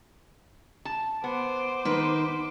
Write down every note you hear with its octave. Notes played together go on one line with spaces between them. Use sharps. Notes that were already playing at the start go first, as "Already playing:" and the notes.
A5
B3 C5 D6
D#3 B4